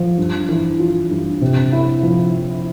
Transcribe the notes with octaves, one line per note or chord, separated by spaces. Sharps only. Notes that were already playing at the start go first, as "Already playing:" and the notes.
Already playing: F3
G2
E3
F4
G2
C3
E4
F3
E4